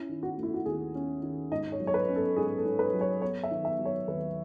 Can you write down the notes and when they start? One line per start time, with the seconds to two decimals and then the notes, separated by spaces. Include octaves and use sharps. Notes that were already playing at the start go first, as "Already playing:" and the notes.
Already playing: C#4 E4
0.09 D#3
0.23 F#4
0.37 A3
0.43 E4
0.54 F#4
0.66 D#2 G#4
0.95 C#4
1.23 D#3
1.51 G#2 D#5
1.72 C#5
1.80 F#3
1.87 C#5
1.94 B4
2.08 C#4
2.16 A4
2.36 G#2 G#4
2.57 A4
2.65 G#2
2.79 B4
2.94 F#3
3.01 C#5
3.22 B3 C#5
3.43 E5
3.51 D#3
3.65 E5
3.79 F#3
3.85 C#5
4.08 D#2 B4